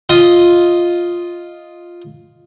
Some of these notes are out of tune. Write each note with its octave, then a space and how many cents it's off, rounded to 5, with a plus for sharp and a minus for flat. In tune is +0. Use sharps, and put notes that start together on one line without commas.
F4 +0 D#5 +0